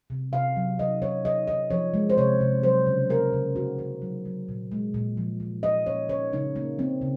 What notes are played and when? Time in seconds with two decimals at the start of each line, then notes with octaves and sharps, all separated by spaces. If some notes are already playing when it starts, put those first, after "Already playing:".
0.10 C3
0.33 C3 F5
0.56 F#3
0.79 D#3 D#5
1.02 D#3 C#5
1.25 D#3 D#5
1.47 D#3 D#5
1.71 F3 C#5
1.94 G#3
2.10 C5
2.17 C3 C#5
2.40 C3
2.63 F#3 C5
2.87 C#3
3.10 A#3 A#4
3.33 C#3
3.56 D#3 F#4
3.79 D#3
4.02 F#3
4.25 F#3
4.48 A#2
4.71 G#3
4.94 A#2
5.17 F3
5.40 D#3
5.63 D#3 D#5
5.86 A#3 C#5
6.09 D#3 C#5
6.33 C#3 D#4
6.56 A#3
6.79 A#3 C4
7.01 C#3